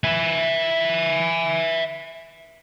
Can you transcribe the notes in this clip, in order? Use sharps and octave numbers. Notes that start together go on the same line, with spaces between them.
E5 G#5